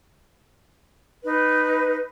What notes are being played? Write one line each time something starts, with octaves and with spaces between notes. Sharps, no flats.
D#4 B4